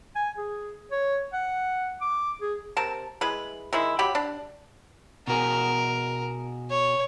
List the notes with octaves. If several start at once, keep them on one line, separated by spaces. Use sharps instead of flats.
G#5
G#4
C#5
F#5
D6
G#4
C3 A#4 A5
G#3 E4 B4
D#3 G#3 E4
F#3 G4 B5
D4
B2 F#4 G#4 A#4
C#5